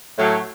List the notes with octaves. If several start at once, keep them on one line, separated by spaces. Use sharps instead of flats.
A2 F#3